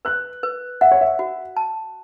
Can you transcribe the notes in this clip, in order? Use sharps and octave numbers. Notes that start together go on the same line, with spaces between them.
B4 F#6
B4
E5 F#5
C#5
E5
F#4
A5